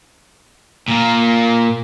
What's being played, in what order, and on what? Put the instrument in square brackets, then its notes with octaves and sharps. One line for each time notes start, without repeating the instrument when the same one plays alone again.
[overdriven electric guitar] A#2 A#3